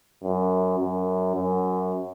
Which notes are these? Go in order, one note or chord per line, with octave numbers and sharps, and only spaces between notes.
F#2
F#2
F#2